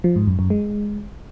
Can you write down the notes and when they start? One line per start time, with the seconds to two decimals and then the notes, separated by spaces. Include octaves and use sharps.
0.04 F3
0.16 G#2
0.27 F#2
0.39 F#2
0.50 G#3